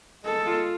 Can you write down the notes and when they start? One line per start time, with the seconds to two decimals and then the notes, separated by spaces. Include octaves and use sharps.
0.25 G#3 A4
0.46 F4